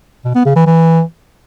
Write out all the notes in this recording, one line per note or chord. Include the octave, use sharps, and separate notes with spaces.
B2
B3
C#3
E3
E3